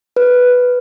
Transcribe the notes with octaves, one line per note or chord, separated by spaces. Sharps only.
B4